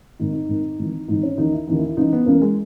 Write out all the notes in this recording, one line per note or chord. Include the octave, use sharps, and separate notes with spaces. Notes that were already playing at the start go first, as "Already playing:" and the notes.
G#1 G#2 D#3 D#4
D#4
G#1 G#2 D#3
G#1 G#2 E3
G#1 G#2 E3 D#4
C#4
D#2 C#3 E3 D#4
E4
D#2 C#3 E3 D#4
E4
E4
C#2 C#3 E3 D#4
B3
C#2 C#3 E3 A#3
G#3